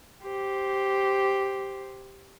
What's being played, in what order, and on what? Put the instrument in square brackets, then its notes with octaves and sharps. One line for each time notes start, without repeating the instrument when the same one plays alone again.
[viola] G4 C5